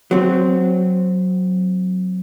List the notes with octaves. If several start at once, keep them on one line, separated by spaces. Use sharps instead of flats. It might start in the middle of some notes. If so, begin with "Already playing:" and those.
F#3 C4